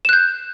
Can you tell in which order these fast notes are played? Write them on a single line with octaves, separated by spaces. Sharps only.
E7 F#6 G6